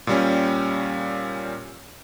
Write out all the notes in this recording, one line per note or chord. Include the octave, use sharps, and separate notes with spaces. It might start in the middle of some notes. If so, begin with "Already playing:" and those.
A#2 G3 C#4